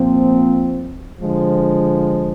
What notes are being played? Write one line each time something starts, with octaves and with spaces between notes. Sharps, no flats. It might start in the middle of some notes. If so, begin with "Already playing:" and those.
Already playing: A#2 F3 C4
D3 F3 G#3